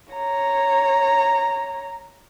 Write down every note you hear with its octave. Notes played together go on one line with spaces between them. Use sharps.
C#5 A#5